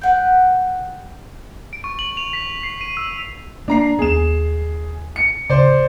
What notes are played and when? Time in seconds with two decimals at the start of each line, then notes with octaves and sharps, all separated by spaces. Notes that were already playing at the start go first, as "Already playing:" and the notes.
0.01 B4 F#5 G5
1.73 D7
1.84 C#6
1.99 F#7
2.17 F7
2.33 B6
2.63 C7
2.81 D#7
2.97 E6
3.68 A#3 D4 A#5 C7
3.99 D#2 B3 G#4 E7
5.16 C#7
5.50 D1 C#3 C5 D5